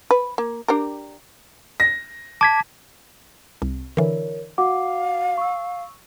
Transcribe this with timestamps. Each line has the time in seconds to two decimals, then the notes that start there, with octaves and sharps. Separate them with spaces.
0.11 B4
0.38 A#3
0.68 D4 G4 A#4
1.80 A#6
2.41 A5 D6 G#6 B6
3.62 C2
3.97 D3 E3 A#4 C#5
4.58 F#4 F5 F#5 D6
5.38 C#6 E6